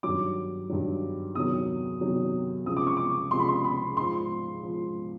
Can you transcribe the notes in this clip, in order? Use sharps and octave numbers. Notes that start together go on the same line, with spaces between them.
G2 D#3 F#3 D6
G2 D#3 F#3
E2 C3 D#3 F#3 D#6
E2 C3 D#3 F#3
C#2 C3 F3 D#6
D6
C#6
D6
C#2 C3 F3 C6
B5
C6
B5
G#2 F3 C6
G#2 F3